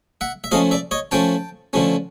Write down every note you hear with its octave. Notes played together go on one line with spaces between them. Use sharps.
E5 F#5
E5
F3 A3 C#4 D#5 F5
D5 E5
C#5 D#5
F3 A3 C#4 G5 A5
D3 F3 A3 C#4